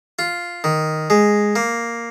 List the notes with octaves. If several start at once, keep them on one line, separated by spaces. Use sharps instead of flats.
F4
D#3
G#3
A#3